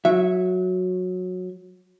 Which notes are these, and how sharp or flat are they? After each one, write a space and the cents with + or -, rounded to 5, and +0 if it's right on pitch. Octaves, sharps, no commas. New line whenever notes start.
F#3 -15 E5 +0